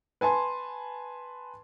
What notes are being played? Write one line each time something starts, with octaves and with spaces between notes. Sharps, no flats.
B4 G#5 A5 C6